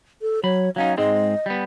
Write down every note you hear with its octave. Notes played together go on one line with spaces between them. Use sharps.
A4
F#3 C#5 B5
F#3 C#4 D#4 F5
G#2 G#3 C4 D#5
G3 B3